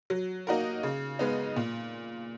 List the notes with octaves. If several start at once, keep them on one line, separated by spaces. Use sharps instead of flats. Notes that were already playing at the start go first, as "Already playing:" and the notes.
F#3
A#3 D#4 F#4 A#4
C#3
G#3 B3 D#4
A#2